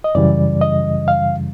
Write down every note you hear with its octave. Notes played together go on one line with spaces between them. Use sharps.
D#5
F#2 C#3 E3 G3 D5
D#5
F5